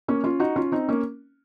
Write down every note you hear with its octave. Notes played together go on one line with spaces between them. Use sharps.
A#3 C#4
C#4 F4
D#4 F#4
C#4 F4
C4 D#4
A#3 C#4